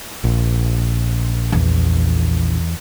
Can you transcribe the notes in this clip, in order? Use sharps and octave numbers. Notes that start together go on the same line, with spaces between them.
A#1
E2